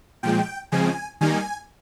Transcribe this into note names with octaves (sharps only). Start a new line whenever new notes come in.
A#2 F3 G#3 G5
C#3 F3 G#3 C4 G#5
D#3 G3 A#3 D#4 G#5